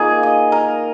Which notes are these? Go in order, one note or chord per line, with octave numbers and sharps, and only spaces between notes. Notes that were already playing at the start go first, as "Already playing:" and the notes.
Already playing: D#3 A#3 F4 G#4
D#5
A#4